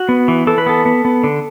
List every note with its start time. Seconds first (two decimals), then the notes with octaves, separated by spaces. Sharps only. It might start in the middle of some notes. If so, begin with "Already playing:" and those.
Already playing: F#4
0.09 B3
0.28 E3
0.47 E3 A4
0.58 B4
0.66 B3 A4
0.86 B3
1.05 B3
1.24 D3